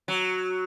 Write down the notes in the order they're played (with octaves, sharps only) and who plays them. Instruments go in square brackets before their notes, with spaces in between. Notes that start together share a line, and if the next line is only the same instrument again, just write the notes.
[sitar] F#3